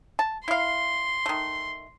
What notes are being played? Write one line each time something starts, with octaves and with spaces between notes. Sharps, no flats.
A5
E4 F5 C6
D#3 A3